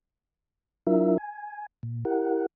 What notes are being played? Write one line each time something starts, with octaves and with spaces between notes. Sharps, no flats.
F#3 D4 E4 F4 A#4 E5
G#5
A#2
E4 G4 A#4 F#5